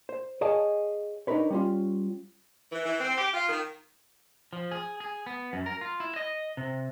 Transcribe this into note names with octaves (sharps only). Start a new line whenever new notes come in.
C5
G#4 C#5 D#5 F5 G#5 A5
D4 D#4 F#4 A#4 B4 C#5
G3 C#4 F4
E3
E3
C4
G4
F4
D#3
F3
G#4
G#4
B3
F#2
A#4
F4
E4
D#5
C3